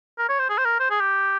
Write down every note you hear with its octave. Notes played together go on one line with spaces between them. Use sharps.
A#4
C#5
C5
G#4
C5
A#4
C5
G#4
G4